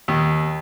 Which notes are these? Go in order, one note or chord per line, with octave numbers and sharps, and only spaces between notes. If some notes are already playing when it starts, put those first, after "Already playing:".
D#2